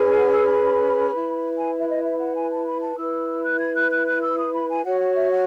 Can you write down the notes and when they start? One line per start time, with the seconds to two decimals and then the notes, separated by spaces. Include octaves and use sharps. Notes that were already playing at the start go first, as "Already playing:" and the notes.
Already playing: C#4 G#4 B4
0.17 F#5
0.32 E6
0.48 B5
1.10 E4 B4
1.57 G#5
1.80 E5
1.89 D#5
2.04 E5
2.19 F#5
2.34 G#5
2.51 A5
2.66 B5
2.81 A5
2.97 E4 B4 E6
3.43 F#6
3.59 G#6
3.75 F#6
3.91 F#6
4.07 F#6
4.22 E6
4.38 D#6
4.53 B5
4.68 G#5
4.84 F#4 C#5 F#5
5.00 F#5
5.15 E5
5.31 F#5